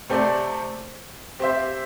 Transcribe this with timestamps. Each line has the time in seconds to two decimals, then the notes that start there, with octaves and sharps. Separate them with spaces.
0.10 C3 A3 C4 A4 D5
1.39 C4 G4 C5 E5